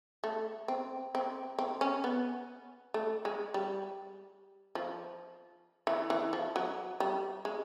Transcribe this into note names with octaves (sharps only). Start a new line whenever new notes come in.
A3
C4
C4
C4
C#4
B3
A3
G#3
G3
F3
E3
E3
F3
F#3
G3
G#3